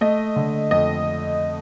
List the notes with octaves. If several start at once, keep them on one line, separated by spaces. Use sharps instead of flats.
A3 D#5
D3
F2 D#5